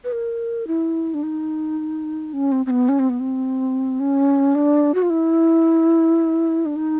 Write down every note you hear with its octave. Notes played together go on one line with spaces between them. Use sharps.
B4
A#4
E4
D4
D#4
C#4
C4
C4
B3
C#4
C4
B3
C4
C#4
D4
F#4
F4
E4
D4
D#4